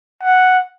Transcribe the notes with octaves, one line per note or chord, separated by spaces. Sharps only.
F#5